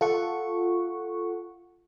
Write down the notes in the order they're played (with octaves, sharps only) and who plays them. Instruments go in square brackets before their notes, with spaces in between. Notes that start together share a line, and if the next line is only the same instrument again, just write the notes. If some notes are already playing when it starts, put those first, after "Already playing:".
[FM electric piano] F4 A4 F#5 C#6